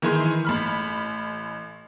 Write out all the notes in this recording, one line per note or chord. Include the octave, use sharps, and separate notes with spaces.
D#3 E3 E4 G#4 C6 G6
A1 B5 F6